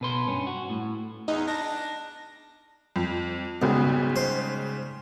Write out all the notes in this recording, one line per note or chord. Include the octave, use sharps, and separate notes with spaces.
B2 B4 C6
G2 C#4
F#4
A2
E2 D#4
D4 A#6
F2
B1 G#2 C#3 G3
C5